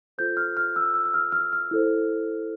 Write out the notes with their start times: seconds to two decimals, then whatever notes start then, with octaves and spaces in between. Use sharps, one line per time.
0.18 F4 A4 C5 G6
0.37 F6
0.57 F6
0.76 E6
0.94 E6
1.05 E6
1.14 F6
1.32 F6
1.53 F6
1.71 E4 A4 C5